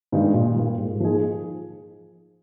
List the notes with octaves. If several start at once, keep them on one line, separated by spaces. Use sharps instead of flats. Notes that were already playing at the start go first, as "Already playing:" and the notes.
G2 D#3 G#3 D#4
A#2
G3 A#3
G#2
F3 A#3 D#4 G#4